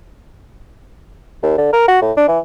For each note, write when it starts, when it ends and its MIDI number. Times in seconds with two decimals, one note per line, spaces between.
1.43 1.53 39
1.58 1.69 50
1.73 1.86 70
1.88 2.00 66
2.02 2.12 45
2.17 2.24 62
2.28 2.39 52